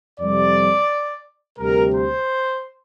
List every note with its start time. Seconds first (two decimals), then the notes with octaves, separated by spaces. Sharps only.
0.19 F2 C3 G3 D5
1.58 D2 C3 G3 A#4
1.93 C5